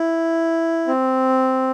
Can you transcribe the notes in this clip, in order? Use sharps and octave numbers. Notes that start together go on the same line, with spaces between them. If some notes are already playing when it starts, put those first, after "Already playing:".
Already playing: E4
C4